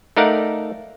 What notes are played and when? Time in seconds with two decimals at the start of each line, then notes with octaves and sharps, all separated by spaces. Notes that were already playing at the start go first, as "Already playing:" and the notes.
0.17 A3 D#4 A#4 D5 F5 F#5